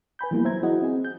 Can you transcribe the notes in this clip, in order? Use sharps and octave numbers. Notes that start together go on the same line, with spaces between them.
B4 G#5 B5 G6
E3 F3 G3 A#3 B3 E4
F#3 C5 E5 A#5 G#6
E4 F#4 G#4 D#5 F#5
C4 G#4
G6